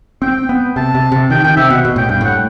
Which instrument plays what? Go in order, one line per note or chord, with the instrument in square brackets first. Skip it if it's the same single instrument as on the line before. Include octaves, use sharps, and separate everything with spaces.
[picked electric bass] C4 [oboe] G5
[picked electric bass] B3
[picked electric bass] C3 [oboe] A5
[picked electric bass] C3
C3
[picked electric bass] D#3 [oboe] G5
[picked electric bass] D#3 [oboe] G5
[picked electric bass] C3 [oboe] E5
[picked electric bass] B2 [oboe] F#5
[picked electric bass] B2
[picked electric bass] A2 [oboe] G5
[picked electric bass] G2 [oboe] G5
[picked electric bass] A2 [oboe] F#5